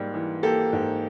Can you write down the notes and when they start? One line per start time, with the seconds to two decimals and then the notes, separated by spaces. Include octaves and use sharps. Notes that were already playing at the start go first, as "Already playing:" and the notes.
Already playing: G#2 G3 A#3
0.14 E3
0.43 A#3 G4 A4
0.73 G#2